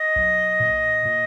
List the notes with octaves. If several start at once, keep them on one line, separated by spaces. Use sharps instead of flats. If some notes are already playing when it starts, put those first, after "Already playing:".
Already playing: D#5
B1
A#2
A#2